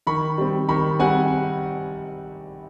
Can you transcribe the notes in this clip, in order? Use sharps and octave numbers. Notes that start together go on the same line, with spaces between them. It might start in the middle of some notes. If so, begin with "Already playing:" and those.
D#3 B5 C#6
G3 C4
D#3 B5 C#6
G3 C4 F#5 G#5